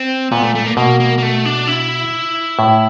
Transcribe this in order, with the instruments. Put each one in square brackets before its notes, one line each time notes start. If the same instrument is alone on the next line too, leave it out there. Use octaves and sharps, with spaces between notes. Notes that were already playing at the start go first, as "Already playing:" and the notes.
Already playing: [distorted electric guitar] C4
[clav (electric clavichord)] A#2 [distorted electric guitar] B3
[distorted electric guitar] A3
A3
A#3
[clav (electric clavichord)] B2 [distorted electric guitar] A#3
[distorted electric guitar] A#3
A#3
A3
D4
E4
[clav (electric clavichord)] A2